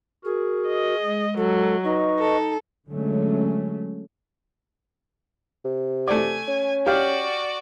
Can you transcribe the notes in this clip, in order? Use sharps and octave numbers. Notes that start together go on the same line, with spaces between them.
F#4 G#4 A#4
D#5
G#3
F#3 A4
D#4 B4 D#5 C#6
A4
D3 F#3 G#3 A3 C#4
C3
A3 D5 G#5
C#4
F#4 G4 D5 F5